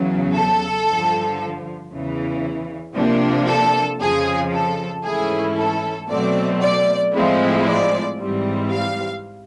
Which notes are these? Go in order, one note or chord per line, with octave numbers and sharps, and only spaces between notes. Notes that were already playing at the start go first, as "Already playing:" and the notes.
Already playing: E2 C#3 F#3
A4
G2 D3 F3
E2 C#3 E3
C3 F3 A#3 D4
A4
F2 C#3 F3 G#4
A4
G#2 E3 A3 C#4 E4 G#4
A4
B2 F#3 A3 C4 D5
D5
A2 F3 G#3 C4 E4
D5
G#2 E3 G3 C4
F5